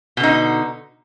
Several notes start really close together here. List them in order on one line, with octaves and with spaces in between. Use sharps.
B2 D3 D#4